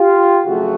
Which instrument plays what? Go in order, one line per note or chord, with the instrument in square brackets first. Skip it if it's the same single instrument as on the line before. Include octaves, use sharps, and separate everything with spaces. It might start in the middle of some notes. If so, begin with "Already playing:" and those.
Already playing: [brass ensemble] F4 G4
F2 C#3 F#3 A3 F#4 G#4